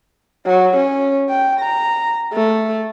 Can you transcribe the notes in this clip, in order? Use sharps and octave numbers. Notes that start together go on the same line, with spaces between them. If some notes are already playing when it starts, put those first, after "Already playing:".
F#3
C#4
G5
A#5
A3